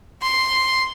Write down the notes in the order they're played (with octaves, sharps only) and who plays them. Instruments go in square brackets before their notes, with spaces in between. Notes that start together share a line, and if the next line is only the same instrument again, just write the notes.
[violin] C6